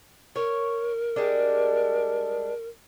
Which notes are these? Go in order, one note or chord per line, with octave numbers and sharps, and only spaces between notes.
A#4 C#5
G3 G#3 D4